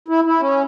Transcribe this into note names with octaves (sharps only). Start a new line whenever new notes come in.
E4
E4
C#4